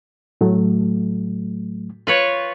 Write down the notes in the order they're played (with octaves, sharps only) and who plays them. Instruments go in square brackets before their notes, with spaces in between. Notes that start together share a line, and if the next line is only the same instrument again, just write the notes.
[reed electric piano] A2 F#3 A3
[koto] F4 B4 C#5